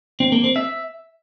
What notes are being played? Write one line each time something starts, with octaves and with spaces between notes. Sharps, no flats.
C4
A#3
C4
E5